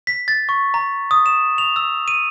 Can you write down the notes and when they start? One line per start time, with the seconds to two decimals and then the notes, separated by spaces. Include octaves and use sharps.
0.07 B6
0.28 A6
0.49 C#6
0.74 A#5
1.11 D#6
1.26 E7
1.58 F7
1.76 E6
2.08 D#7